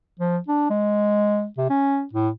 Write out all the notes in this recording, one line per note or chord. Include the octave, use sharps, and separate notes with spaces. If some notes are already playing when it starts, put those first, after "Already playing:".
F3
D4
G#3
C3
C#4
A2